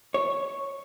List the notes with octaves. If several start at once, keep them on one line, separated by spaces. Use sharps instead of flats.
C#5